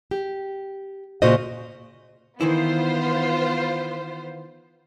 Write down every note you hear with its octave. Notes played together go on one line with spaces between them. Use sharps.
G4
A#2 C#3 F#4 C5 D#5
D#3 E3 B3 E4 F4 C5